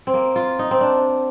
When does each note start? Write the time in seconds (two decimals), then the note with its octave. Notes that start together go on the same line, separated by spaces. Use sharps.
0.07 C4
0.14 A#3
0.36 F4
0.59 D#4
0.71 C4
0.81 D4